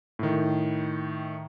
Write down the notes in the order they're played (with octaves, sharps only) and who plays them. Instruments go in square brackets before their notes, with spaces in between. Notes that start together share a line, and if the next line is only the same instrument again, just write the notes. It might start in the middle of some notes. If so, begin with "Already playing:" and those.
[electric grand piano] A2 D#3